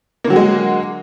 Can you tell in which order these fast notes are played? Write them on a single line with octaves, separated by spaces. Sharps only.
A#3 D3 F#3 F#4 G#3